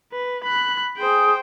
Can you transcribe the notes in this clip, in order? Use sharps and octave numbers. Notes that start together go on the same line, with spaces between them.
B4
B5 F#6
G#4 C5 G5